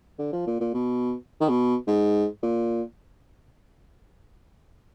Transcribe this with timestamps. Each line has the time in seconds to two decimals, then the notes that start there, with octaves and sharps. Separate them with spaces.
0.19 D3
0.33 F3
0.47 A#2
0.61 A#2
0.74 B2
1.41 D#3
1.49 B2
1.87 G#2
2.43 A#2